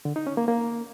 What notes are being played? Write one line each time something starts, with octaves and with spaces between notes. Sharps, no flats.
D3
D#4
C#4
A#3
A#3